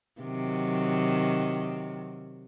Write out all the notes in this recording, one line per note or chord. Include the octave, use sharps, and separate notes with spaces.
C3 D#3 F#3